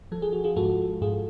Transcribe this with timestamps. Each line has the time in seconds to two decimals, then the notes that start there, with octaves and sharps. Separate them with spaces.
0.12 F3 A4
0.22 G#4
0.33 F#4
0.44 F4 G#4
0.56 G#2 F#4 A4
1.01 G#2 F4 G#4